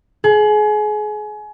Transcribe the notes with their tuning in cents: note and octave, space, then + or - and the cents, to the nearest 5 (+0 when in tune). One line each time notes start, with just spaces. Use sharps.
G#4 +30